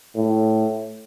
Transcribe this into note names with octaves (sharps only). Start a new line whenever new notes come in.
A2